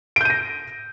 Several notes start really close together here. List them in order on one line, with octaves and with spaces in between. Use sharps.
D7 G6 D#7 A#6